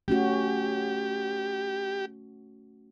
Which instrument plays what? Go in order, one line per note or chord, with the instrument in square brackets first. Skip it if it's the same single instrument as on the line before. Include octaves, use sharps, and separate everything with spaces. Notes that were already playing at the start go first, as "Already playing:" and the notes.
[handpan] A3 C#4 F#4 [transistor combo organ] G4